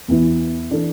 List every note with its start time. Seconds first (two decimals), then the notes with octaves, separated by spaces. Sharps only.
0.08 E2 E3 B3 E4
0.71 E3 D4 A4